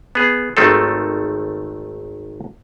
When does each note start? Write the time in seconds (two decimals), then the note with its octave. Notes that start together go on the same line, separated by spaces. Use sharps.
0.15 B3 G#4
0.57 G#1 D#3 A3 C4 F4 A4